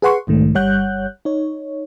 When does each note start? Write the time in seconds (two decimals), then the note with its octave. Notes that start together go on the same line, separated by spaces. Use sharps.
0.02 G#4 B4 F#5 C6 C#6
0.27 B1 G#2 D#3 A3
0.55 G1 G3 C#5 F#5 F#6 G6
1.25 D#4 C#5